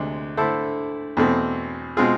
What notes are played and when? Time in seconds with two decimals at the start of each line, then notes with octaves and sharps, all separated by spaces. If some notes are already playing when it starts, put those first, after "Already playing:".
Already playing: D2 C3 G#3 D4
0.37 D3 A3 E4 A4 C5
1.17 E2 B2 A3 C4
1.97 B2 G#3 C4 F4 G#4